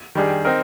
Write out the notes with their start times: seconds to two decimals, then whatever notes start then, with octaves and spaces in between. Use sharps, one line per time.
0.15 D#3 G3 D4 G#4
0.45 C4 D#4 A#4